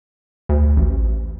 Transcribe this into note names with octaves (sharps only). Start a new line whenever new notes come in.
D2
A1